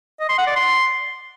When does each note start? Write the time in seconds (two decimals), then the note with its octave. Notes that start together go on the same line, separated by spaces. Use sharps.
0.20 D#5
0.29 C6
0.38 F#5
0.47 D5
0.56 C6